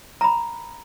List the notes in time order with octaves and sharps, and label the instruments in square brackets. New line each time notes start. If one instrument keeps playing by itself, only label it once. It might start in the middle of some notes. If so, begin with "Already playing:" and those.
[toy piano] A#5 B5